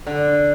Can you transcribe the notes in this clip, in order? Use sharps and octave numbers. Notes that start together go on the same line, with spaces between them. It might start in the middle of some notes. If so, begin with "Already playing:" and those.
D3